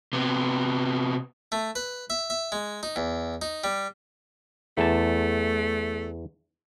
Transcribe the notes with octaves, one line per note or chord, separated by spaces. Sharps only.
C3 B3
A3
B4
E5
E5
G#3
D#4
E2
D#4
G3
E2 A3 A5